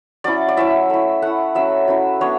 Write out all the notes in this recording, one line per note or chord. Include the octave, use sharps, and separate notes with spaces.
F#3 C#4 E4 D5
D5
F#3 C#4 E4 E5
A3 E4
A3 E4 F#5
F#3 C#4 E4 E5
F#3 C#4 E4
F#3 B3 D4 C#5